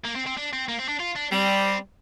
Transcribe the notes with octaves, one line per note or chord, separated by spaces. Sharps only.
A#3
C4
C4
D4
C4
A#3
C4
D4
F4
D4
G3 C4